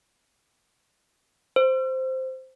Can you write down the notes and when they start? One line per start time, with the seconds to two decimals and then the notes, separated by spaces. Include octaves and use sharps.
1.56 C5